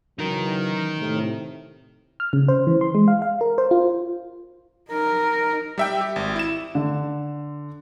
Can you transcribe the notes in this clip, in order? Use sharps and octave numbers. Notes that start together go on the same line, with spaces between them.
C#3 E3 F#3 D#4 A#4
A2 C3
F6
C#3
C5
E3
C6
G#3
F5
F5
A#4
C5
F4
D#4 A#4
G3 E5 G5
G4
G#1
E4 E7
D3